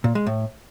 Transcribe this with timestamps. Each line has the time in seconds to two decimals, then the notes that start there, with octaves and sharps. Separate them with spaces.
0.04 A#2
0.15 G#3
0.26 A2